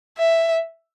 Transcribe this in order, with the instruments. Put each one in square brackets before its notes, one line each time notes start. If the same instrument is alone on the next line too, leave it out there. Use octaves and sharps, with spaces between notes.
[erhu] E5